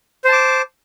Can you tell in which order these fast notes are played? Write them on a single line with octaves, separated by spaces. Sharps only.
C5 A5 D6